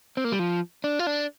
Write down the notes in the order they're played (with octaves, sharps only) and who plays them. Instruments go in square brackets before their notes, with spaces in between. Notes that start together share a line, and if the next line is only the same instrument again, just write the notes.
[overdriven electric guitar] C4
A#3
G3
F3
D4
F4
D4